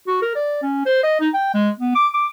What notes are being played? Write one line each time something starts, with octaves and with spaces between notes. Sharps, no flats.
F#4
A#4
D5
C#4
C5
D#5
D#4
G5
G#3
B3
D6
D6